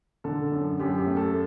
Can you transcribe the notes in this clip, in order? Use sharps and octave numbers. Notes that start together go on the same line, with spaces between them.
D3 A4
F#2
F#2 G4
G4
A3
A4